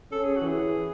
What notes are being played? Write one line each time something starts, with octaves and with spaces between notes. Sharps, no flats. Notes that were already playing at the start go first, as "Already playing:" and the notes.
C#4 A4
G#4
F#4
E3
G#4